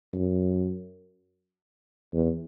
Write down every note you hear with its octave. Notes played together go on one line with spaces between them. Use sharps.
F#2
E2